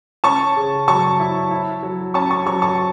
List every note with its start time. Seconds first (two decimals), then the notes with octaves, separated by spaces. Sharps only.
0.24 C#4 A5 C#6
0.56 C#3
0.88 F#3 A5 C#6
1.19 E4
1.51 E4
1.83 F#3
2.14 C#4 A5 C#6
2.30 A5 C#6
2.46 F#3 A5 C#6
2.62 A5 C#6